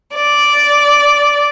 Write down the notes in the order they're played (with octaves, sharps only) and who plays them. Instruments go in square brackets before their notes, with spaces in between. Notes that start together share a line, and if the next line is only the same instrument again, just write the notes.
[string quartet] D5